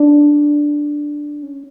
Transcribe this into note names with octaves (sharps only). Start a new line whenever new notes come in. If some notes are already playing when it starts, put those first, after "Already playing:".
Already playing: D4
C#4